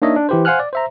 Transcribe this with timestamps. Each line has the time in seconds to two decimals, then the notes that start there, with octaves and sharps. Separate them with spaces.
0.02 A#3 D4 D#4 C#5 D#5 E5
0.16 D4
0.29 E3 E4 G4 B4 C5
0.45 C5 F5 F#5 G#5 F6 F#6
0.59 D5
0.73 C5 E5 A#5